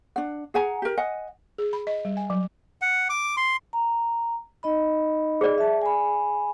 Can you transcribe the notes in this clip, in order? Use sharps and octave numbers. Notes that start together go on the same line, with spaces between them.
D4 F#5
G#4 F#5 G#5 A#5
G4 A#4
D#5 F#5 G#5
G#4
B5
D#5
G3
G#5
F#3
F#5
D6
C6
A#5
D#4 D#5 B5
G#4 D5
E5 A5
G#5 B5